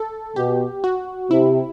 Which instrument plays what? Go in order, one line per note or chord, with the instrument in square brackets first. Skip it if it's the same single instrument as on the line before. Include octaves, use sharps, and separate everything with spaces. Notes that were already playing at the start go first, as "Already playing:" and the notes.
Already playing: [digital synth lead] A4
[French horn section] B2 [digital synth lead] G4
[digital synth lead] F#4
[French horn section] C3 [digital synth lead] E4